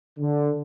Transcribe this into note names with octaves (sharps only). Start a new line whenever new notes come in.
D3